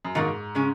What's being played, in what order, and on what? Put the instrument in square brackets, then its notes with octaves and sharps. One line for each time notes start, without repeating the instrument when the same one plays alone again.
[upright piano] F#2
[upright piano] G#2 [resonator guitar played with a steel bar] D#3 A#3 F#4 A#4
[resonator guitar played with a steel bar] C#3 G#3 C#4